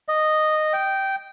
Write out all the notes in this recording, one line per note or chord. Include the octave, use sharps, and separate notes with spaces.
D#5
G5